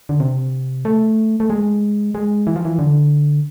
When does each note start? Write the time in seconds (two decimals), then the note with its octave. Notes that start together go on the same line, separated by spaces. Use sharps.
0.09 D3
0.20 C3
0.85 A3
1.40 A3
1.50 G#3
2.15 G#3
2.47 E3
2.56 F3
2.65 E3
2.79 D3